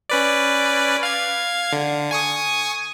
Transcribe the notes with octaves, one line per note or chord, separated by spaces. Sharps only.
C#4 B4 D5
F5 G#6
D3
G#5 C#6 D#6